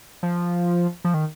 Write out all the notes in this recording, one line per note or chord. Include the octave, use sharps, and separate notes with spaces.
F3
F3
D#3